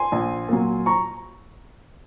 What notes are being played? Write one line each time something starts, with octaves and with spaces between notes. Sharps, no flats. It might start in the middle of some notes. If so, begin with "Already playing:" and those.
Already playing: G#5 C6
A#1
A#2 F#3
A#5 C#6